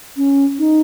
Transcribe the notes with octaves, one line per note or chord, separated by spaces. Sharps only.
C#4
D#4